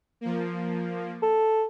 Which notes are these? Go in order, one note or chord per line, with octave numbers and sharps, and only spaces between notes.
F3 A#3
A4